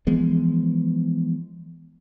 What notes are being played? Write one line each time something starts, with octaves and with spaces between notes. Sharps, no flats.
E3 F3 G#3 B3